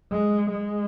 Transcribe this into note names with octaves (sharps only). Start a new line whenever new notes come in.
G#3
G#3